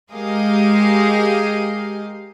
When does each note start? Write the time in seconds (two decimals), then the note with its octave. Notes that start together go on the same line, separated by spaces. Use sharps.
0.12 G#3 G4 G#4 A#4 D#5 F5